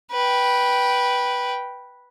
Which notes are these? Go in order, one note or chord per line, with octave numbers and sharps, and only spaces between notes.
B4 G5